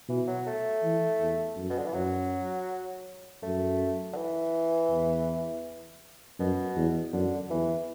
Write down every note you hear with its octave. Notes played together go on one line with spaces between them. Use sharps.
B2 E3
F#3
A3
E3
E2
F#2
B2
D3
E3
F#2 F#3
F#2 A3
D3
E3
E2
F#2 B2
E2
F#2 D3
E2 E3